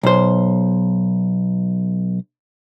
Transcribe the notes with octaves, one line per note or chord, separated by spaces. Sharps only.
B1 C5